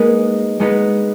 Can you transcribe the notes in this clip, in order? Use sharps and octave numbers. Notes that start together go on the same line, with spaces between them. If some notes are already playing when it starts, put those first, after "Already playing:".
Already playing: G#3 A#3 B3 D#4 G#4 A#4 B4
G#3 B3 D#4 G#4 B4